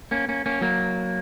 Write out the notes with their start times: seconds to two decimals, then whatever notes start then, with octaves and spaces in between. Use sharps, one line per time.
0.11 A#3 C#4
0.29 A#3 C#4
0.46 A#3 C#4
0.61 F#3 A#3